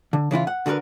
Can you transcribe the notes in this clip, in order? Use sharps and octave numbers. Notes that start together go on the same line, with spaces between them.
D3
C#3 E3 E4 F4
F#5
D3 F#4 G#4 A#4 B4